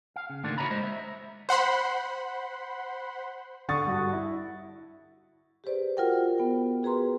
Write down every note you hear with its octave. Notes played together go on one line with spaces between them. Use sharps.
F5
C#3
A2 D3 D#3 A#3 D4 F4
F#4 A4 C#5 E5 A#5 B5
G#3 C5 D#5
E5
C5 F#5 B5 C6
D3 C#6 D#6 A6
G2 F#4
E4
G4 G#4 B4 C5 D5
F4 F#4 A#4 F#5 G5
B3 C5 G5
F#4 G#4 B4 A#5 C6